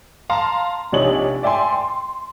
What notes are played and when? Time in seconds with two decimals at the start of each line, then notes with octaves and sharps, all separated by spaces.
0.30 F5 A5 A#5 C6
0.92 A#1 C3 D4 D#4 C#5 F#7
1.43 D5 E5 G5 G#5 C6
1.72 C6